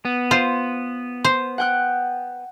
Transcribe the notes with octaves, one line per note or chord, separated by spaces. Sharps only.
B3
F4 C5
C5
F#5 G5 F#6